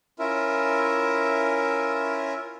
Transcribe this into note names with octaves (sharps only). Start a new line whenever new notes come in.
C#4 E4 F4 A#4 E5